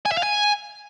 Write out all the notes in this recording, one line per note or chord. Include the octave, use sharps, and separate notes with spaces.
G#5
E5
F5
G#5